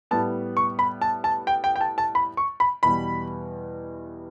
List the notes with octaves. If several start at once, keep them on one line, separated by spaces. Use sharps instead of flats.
A2 G3 B3 A5
C#6
B5
A5
A5
G5
G5
G5
A5
A5
B5
C#6
B5
E2 B2 G3 B5